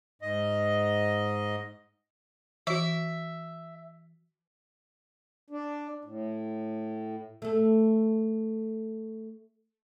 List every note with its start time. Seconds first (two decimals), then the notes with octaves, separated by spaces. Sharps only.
0.22 G#2 D#5
2.67 E3 F#4 E5
5.50 D4
6.05 A2
7.42 A3 A4